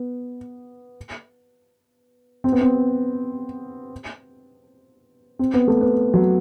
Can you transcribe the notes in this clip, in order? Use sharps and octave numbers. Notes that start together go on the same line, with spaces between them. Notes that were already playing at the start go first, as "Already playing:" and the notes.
Already playing: B3
C4
B3
C4
C4
B3
A3
B3
F#3